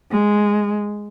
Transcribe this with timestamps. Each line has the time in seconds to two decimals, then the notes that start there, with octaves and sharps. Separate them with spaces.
0.11 G#3